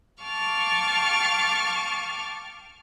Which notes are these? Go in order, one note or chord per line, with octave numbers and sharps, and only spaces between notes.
F5 G5 A5 C#6 D6 F6